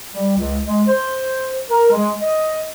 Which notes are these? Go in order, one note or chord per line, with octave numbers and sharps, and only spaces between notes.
G3
C#2
G#3
C5
A#4
G#3
D#5